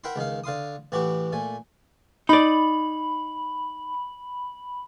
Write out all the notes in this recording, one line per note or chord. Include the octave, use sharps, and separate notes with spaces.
A#4 E5 F#5 G5 B5 C6
C#2 D#3 D#4 F5
D3 F5 C6 D#6
A2 E3 E4 F#4 G4
A#2 A3 G#5
D#4 D5 B5